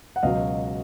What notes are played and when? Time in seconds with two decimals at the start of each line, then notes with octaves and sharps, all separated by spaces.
0.16 F#5
0.23 C#2 B2 F#3 D#5 F5